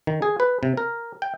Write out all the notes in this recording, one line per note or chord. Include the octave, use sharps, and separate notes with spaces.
D#3
G#4
B4
C3
A#4
G5